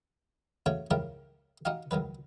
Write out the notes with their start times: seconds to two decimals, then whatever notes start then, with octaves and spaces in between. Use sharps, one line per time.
0.66 C#3 A3 C#4 F#4 C#5
0.91 C#2 C#3 F3 E4 G4 A#4
1.65 D#4 F#4 G4 F5
1.91 C#2 D#3 F#3 B4